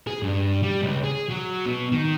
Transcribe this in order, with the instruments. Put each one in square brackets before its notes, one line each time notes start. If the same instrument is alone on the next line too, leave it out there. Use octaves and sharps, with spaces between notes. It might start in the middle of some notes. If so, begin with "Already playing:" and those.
[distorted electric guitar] G#4
G2
G3
C#2
G#4
F#3
B2
D#3